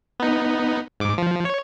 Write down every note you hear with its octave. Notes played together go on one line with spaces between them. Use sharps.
B3 D#4
G#2 D6
F3
C#5